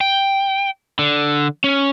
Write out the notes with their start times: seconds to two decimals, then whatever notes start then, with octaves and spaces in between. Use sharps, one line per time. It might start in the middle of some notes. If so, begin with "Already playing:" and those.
0.01 G5
0.99 D3
1.64 C#4